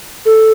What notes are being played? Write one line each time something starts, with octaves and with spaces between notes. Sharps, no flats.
A4